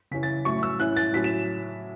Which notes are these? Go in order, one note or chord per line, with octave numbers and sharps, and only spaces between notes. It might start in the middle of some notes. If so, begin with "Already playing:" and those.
C#3 E3 C#4 E4 B6
A6
A2 F#3 A3 C#4 E4 C#6
E6
A2 E3 C#4 E4 F#6
A6
A2 F#3 C#4 B6
E7